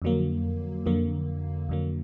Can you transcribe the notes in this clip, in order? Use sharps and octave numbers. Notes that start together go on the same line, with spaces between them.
F2 D3 F#3 A#3
F2 D3 F#3 A#3
F2 D3 F#3 A#3